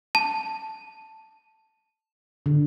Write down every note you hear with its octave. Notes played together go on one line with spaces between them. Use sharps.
A5
D3